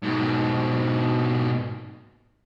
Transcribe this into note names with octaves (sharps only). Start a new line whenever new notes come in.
G#2 B2